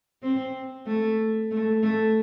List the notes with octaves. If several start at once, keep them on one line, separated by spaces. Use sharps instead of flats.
C4
A3
A3
A3